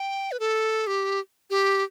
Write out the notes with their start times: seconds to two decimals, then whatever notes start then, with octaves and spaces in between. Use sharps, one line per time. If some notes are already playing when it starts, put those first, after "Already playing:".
Already playing: G5
0.32 B4
0.40 A4
0.87 G4
1.50 G4